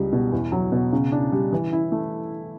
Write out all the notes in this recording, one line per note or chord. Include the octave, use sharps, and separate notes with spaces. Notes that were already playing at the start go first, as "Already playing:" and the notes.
Already playing: C#2 G3
B2
E2
F#3
B2
C#3
D4
G3
E3
E4
A3